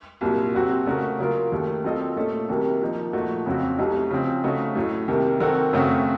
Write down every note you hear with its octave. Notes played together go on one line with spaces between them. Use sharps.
C2 A#2 F#3
C3 F#3 C4 F#4
C#3 A3 C#4 F#4 A#4
C#3 F#3 A#3 F4 A#4
D#2 D#3 A3
F#3 C4 F4 A4 D#5
A#2 A3 C#4 A4 D#5
C2 C3 D#3 F#3 A#3
F3 A#3 D#4
A#2 F3 A3 D#4 F#4
F2 C#3 F#3 C4 F#4
C2 C3 F#3 A3 D#4
C#3 F3 C4
C#3 A3 D#4 F#4
A2 F#3 A3
C2 C3 D#3 A#3
D#3 F#3 C4 F#4 A4
F#2 C#3 A3 C4 F#4